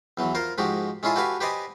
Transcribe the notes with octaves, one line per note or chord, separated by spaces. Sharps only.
E2 E3 F#3
F4 A#4 C5
G#2 F3 G#3 F#4 G4
G#3 C#4 E4 F4 G#4 A4
F#4 G4 A4 B4 F5 G#5
G4 B4 C5 D5 D#5 G#5